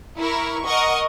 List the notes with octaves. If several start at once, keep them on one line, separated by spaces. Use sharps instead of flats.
E4 A#4 C#6
A#4 D#5 F#5 C#6